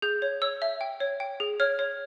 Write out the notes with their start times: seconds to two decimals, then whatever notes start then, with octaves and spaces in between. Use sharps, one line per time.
0.02 G#4 G6
0.22 C#5
0.42 C#5 E6
0.62 E5
0.81 G5
1.00 C#5
1.20 G5
1.40 G#4
1.60 C#5 F6
1.79 C#5